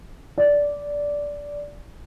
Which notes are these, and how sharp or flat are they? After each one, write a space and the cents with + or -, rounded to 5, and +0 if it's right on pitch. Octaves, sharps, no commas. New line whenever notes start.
D5 -10